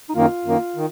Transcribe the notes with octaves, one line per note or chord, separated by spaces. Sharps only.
D#4
F#2 D#3 A#3 F4
F#2 D#3 A#3
D#3